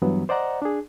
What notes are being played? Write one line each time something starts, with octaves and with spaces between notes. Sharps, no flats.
G2 E3 F#3 B3
C5 D5 D#5 F#5 A#5
D4 G#4